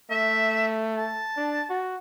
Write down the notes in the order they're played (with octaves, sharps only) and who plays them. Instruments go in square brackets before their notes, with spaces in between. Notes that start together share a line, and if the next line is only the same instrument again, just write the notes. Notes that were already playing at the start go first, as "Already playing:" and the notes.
[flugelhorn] A3 [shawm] E5
[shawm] A5
[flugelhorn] D4
F#4